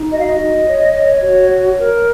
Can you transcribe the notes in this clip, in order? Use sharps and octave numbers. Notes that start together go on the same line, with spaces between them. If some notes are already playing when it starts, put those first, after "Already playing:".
Already playing: D#4
F#4 D#5
F5
D#5
F#4
C#5
C#5
F#4 C#5
C#5
A#4